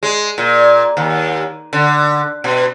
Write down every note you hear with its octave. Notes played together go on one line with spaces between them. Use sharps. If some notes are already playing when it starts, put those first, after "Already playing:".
G#3
A#2
D#2
D3
B2